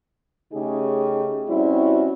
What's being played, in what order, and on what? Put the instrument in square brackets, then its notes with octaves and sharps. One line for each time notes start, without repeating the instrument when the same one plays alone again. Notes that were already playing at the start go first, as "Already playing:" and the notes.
[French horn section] C#3 A3 D#4 G4 G#4
G3 C4 C#4 E4 F#4